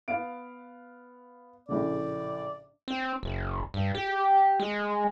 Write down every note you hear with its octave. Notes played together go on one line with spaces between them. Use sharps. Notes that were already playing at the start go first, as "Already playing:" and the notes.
B3 F5 D7
A#1 A2 C#3 D5
C4
F#1
G2
G4
G#3